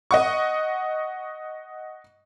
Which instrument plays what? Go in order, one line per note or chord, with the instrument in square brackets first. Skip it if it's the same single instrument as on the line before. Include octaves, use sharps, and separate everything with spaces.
[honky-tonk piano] D#5 F#5 C#6